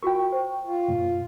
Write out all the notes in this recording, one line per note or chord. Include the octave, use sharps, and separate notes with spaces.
F4 F#4 A#4 G5 C#6
C5
F4
F#2 A#2